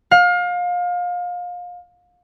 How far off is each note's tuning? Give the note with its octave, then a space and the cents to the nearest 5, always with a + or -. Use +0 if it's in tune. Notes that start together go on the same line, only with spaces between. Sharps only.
F5 +30